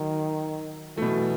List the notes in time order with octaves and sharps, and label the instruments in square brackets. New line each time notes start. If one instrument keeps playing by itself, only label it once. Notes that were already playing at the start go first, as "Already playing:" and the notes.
Already playing: [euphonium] D#3 [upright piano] F#3
[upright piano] B2 F#3 A3 [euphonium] E3